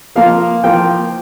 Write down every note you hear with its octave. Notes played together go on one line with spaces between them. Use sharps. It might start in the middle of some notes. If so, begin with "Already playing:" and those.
F3 A#3 F4 F5
F3 A#3 F4 G5